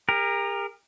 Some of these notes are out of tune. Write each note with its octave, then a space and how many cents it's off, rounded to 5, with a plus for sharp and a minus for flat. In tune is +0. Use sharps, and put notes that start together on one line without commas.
G4 +45 A#4 +0